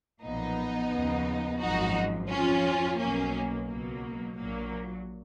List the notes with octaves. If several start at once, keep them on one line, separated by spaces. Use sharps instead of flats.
B1 A#2 F3 B3 D#4
D#2 C#3 F3
G#1 F#2 F3 D#4 F#4
F2 F3 C#4 F4
B1 B2 F#3 A#3 C#4
A#3
C#2 B2 F#3 A#3
A#1 A#2 F#3 A#3